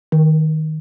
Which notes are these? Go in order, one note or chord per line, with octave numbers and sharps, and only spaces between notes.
D#3